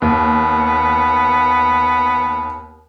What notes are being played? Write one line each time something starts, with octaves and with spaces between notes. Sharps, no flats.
D#2 B3